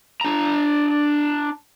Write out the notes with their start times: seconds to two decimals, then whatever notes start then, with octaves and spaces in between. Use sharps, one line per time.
0.21 D4 A#5